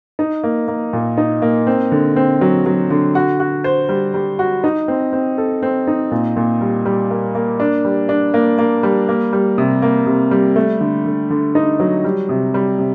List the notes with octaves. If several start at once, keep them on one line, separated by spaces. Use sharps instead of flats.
D#4
A#3
A#3
A#2
D#4
A#3
C4
D3
C4
F#3
F#3
D3
F#4
F#4
C5
G3
G3
F#4
D#4
C4
C4
A4
C4
D#4
A#2
A#2
G3
G3
A#3
A#3
D4
G3
D4
A#3
A#3
G3
A#3
G3
C3
A#3
C3
G3
A3
D3
D3
D3
D#4
F#3
G3
C3
G3
C3